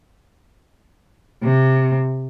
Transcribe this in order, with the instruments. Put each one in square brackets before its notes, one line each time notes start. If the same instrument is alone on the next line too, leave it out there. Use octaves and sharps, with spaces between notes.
[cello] C3